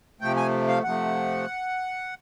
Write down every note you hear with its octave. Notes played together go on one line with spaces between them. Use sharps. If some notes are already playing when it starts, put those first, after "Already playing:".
C3 F3 A3 G5
G#5
F5
C3 F3 A3 F#5